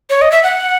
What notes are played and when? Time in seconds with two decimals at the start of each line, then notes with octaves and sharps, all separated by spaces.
0.10 C#5
0.22 D#5
0.32 E5
0.43 F#5